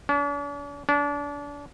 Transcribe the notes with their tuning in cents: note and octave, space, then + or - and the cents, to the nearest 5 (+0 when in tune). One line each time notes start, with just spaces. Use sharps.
D4 -45
D4 -30